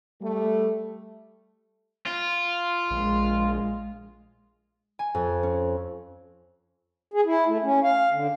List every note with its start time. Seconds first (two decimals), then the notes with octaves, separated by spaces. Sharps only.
0.21 G3 A3
2.06 F4
2.91 A#1 G#3
4.99 G#5
5.15 F2
5.43 C#4
7.14 G#4
7.25 E4
7.48 A3
7.63 C#4
7.83 F5
8.12 D3